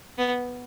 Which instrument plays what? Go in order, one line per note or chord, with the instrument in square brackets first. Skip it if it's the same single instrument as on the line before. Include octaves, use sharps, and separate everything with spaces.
[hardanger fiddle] B3